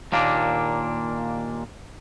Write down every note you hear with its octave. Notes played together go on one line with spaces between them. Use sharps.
D#2 A#2 A#3 D4